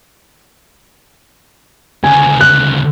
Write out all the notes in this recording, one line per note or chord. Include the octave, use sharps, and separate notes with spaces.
D2 C#3 G#5
F#6